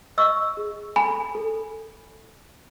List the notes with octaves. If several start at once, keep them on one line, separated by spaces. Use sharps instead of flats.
D#5 C#6 E6
G#4
A4 G#5 B5
A4